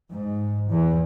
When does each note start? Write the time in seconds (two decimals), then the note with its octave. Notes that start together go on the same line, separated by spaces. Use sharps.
0.12 G#2
0.71 E2